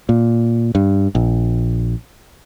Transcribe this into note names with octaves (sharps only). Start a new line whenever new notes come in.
A#2
G2
A#1